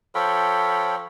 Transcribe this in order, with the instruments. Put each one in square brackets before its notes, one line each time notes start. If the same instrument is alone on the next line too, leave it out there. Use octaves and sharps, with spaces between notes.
[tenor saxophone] F3 [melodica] A4 [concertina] C#5 G5 B5